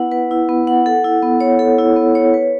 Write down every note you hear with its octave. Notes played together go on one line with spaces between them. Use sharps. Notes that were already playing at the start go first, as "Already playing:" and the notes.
Already playing: B3 E4 B4 F#5
B4
E4
B3
F#5
A4
E4
B3
C#5
A4
E4
B3
C#5
B4